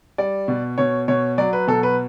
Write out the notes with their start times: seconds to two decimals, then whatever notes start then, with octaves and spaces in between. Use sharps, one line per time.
0.18 G3 D5
0.48 B2
0.78 B2 C#5
1.08 B2 C#5
1.38 F#3 D5
1.53 B4
1.68 B2 A4
1.83 B4